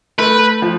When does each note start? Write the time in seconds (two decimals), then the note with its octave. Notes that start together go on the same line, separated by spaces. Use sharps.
0.18 A3 B4
0.62 F3